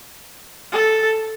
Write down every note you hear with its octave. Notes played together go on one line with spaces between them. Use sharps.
A4